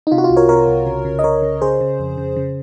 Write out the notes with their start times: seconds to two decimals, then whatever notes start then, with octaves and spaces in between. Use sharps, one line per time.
0.07 D#4
0.11 C3 F4
0.18 F#4
0.24 F4
0.30 C2
0.36 A#4 C#5
0.49 C3 A#4 C#5
0.68 C2
0.86 C#3
1.05 C#3
1.19 D#5
1.24 C#3 A#4 C#5
1.42 C#3
1.62 C#3 G#4 C5
1.81 C#3
1.99 F2
2.18 C#3
2.36 C#3